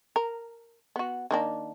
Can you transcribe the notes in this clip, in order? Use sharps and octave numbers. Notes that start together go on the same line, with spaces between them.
A#4
B3 F#4
D#3 A#3 D4